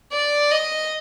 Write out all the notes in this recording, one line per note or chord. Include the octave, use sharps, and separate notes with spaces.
D5
D#5